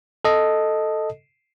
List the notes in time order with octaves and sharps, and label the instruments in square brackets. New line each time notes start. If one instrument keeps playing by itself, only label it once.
[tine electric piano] A4 D#5